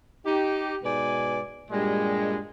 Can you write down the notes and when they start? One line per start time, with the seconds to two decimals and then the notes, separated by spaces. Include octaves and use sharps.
0.25 D#4 G4
0.84 G#2 B2 B4 D5 G#5
1.71 G2 A#2 G3 G#3